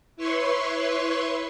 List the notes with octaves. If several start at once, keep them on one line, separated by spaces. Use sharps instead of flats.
E4 B4 C#5 C6 C#6